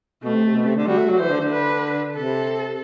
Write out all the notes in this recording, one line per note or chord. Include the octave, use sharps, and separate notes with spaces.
B2 A3
C3
C3
B2
C3
D3
G3 F#4
A3
F#3
E3 C5
D3
D3
B4
C3 A4